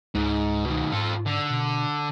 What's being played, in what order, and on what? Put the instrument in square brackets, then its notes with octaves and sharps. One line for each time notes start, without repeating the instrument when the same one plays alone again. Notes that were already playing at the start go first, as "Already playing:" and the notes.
[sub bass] C#2 [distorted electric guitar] G#2
[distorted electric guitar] B2 D#3
[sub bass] G#2 [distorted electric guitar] F4 A4
[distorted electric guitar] D3
[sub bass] B2